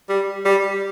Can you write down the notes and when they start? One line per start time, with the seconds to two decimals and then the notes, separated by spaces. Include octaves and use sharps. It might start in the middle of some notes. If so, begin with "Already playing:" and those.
0.09 G3
0.45 G3